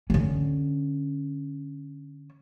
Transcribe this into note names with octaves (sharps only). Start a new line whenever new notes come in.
D3 C#4